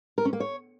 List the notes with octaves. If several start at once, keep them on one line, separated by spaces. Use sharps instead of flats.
A#4
C#4
A#3
C#5